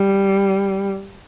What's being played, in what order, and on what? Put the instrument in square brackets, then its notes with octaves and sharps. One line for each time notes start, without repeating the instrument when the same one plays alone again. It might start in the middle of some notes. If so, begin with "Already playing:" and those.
Already playing: [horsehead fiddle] G3